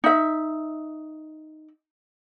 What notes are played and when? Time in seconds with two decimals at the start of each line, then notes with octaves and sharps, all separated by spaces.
0.04 D#4 E5